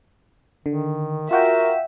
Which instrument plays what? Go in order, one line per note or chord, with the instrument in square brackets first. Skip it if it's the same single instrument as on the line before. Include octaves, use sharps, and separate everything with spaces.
[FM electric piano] D3 [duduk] D#3
[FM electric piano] F4 F#4 G5 [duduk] A#4 [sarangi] E5